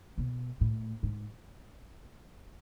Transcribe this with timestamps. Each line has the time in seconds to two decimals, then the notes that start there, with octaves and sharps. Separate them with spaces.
0.18 B2
0.61 A2
1.03 G#2